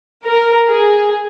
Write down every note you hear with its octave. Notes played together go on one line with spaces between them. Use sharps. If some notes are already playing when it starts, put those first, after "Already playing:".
A#4
G#4